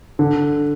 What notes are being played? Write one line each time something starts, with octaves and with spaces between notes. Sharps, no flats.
D3